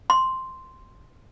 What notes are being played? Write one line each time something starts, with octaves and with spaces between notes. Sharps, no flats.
C6